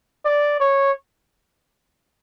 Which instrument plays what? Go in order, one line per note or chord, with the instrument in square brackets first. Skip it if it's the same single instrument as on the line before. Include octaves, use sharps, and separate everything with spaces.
[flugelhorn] D5
C#5